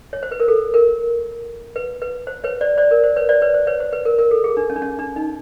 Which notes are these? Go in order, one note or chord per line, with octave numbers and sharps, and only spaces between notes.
C#5
C5
B4
A#4
A4
A#4
B4
B4
C5
B4 C#5
C5 D5
C5 D5
A#4
C5
B4 C#5
C5 D5
B4 C#5
C5
B4 C#5
C5
B4
A#4
A#4
A4
G#4
D4
C#4
D4
C#4
D4
D#4